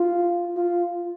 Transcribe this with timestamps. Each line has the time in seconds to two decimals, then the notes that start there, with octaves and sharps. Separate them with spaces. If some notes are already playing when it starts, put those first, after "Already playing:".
Already playing: F4
0.57 F4